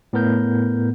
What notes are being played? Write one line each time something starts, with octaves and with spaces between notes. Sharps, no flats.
A2 B3 A#4 G6